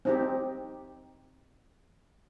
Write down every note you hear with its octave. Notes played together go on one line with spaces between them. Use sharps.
C4 D#4 G4